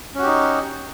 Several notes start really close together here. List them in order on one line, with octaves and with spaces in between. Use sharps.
C#4 F#4 G4 D#4